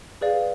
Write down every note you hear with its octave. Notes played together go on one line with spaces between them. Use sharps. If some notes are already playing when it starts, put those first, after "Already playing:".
G#4 B4 D5 F5